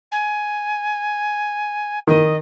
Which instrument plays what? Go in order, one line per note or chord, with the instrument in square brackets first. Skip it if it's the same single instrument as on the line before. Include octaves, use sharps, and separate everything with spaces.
[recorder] G#5
[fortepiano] D#3 [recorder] D#5